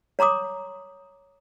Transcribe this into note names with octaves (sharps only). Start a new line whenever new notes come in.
C#5 A#5 C6 D6 D#6